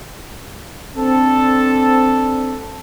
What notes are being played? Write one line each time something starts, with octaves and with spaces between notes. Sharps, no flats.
C4 D4 A4